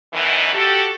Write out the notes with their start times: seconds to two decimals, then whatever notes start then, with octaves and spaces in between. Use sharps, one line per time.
0.14 F#2 B2 D#3 E3
0.54 F#4 G4 A4